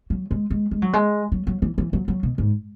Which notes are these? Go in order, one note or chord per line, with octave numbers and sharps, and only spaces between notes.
F#3
G#3
G#3
G#3
F#3
G#3
F#3
F#3
E3
E3
F#3
F#3
B2
G#2